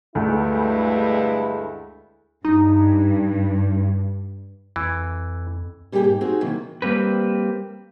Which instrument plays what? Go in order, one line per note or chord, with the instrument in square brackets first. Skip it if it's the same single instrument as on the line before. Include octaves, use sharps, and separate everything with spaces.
[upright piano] D2 A3 [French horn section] G2 G#3 E4
[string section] G2 [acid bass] D#4
[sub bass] F2 [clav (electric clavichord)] E3
[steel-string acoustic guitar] B2 G3 A#3 F4 G4 G#4
G#2
C4 D#4 F#4 G#4
C3 D#3 E3 F#3 A#3
[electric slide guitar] G3 A#3 C4 B4